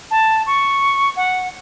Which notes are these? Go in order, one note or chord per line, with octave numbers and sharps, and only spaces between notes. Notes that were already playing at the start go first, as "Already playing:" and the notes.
A5
C#6
F#5